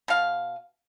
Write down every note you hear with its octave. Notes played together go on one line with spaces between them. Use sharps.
B2 F5